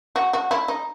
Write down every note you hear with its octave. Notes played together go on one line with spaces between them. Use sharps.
F#4
F#4
E4
D#4